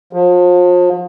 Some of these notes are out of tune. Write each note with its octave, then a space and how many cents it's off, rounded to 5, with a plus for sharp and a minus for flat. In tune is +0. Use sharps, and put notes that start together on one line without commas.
F3 +35